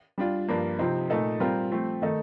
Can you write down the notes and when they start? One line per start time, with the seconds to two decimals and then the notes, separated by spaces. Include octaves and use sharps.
0.18 G3 D4 F4
0.48 G2 F3 A#3 D4
0.79 C3 F3 C4 D#4
1.10 A#2 A3 D#4 A4
1.40 G3 C4 F4 A#4
1.71 F3 A3 C4
2.02 D#3 A3 D#4 A4